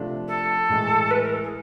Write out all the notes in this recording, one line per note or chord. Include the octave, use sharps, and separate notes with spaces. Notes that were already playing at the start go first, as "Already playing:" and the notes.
Already playing: C3 F3 A3 D4
A4
A2 E3 G#3
B4
A#4
A4
G#4